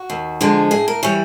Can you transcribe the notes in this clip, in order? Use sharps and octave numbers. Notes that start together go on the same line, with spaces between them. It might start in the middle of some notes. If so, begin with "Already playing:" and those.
Already playing: F#4
D#2
D3 F3 G#3
A2 G#4
A#4
E3 G3 C#5